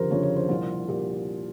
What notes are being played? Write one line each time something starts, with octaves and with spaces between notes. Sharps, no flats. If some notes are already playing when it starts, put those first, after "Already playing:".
Already playing: G1 F2 C#3 F3 G4 A#4 C5
G1 F2 C#3 F3 C#5
C#5
C5
C2 A#2 F3 F4
A#2 G4